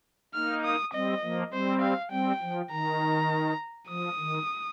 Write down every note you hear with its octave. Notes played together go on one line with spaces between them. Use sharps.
A#3 D#4 F6
D#6
G3 C4 D#5
F3 A#3
G3 C4 C5
F5
G3 C4 G5
F3
D#3 A#5
F3 D#6
D#3